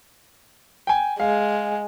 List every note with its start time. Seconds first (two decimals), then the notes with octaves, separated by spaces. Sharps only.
0.87 G5 G#5
1.20 G#3 F5